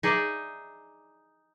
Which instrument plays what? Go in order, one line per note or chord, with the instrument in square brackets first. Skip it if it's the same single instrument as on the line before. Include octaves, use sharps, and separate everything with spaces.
[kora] D#4 G#4 D5 E5